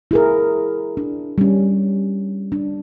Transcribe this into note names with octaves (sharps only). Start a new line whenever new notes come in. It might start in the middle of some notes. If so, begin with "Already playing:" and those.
E4 G#4 A#4
D4
G3 C#4
D4